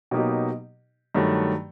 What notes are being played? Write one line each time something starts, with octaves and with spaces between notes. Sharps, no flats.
B2 F#3 A#3 D#4 G4
G2 D#3 F#3 A3